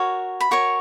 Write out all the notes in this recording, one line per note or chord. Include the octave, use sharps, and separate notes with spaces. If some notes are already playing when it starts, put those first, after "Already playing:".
Already playing: F#4 A#4 C#5
B5
F#4 A#4 C#5 C#6